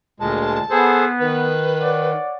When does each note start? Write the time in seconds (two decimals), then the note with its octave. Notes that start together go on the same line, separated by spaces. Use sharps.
0.20 D2 A#2 G#3 A5
0.70 B3 G#4 A4 C5
1.20 D#3 B4
1.80 C#5 D5 F#5